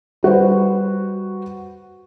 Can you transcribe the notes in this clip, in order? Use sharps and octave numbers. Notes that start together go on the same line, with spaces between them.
G3 F#4 B4 C5